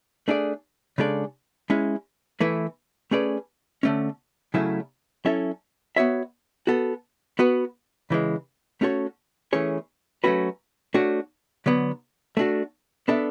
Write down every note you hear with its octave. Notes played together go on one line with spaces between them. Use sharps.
A3 D4 G#4 D5
C#3 G#3 D4 A4 D5
G#3 C#4 E4
E3 A3 E4 B4
A3 C#4 G#4 B4 D5
D3 A3 C#4
C#3 F#3 A3 C#4 E4
F#3 C#4 E4 A4 E5
B3 F#4 C#5 E5
B3 F#4 A4
B3 F#4 B4
C#3 E3 G#3
A3 C#4 F#4 A4 C#5
E3 A3 C#4 G#4 C#5
F#3 A3 C#4 F#4 B4
A3 D4 F#4 C#5
D3 F#3 B3
A3 D4 F#4
B3 D4 A4 E5